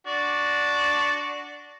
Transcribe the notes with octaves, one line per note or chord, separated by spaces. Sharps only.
D4 F#4